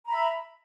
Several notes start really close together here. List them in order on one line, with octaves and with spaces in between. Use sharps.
A#5 B5 E5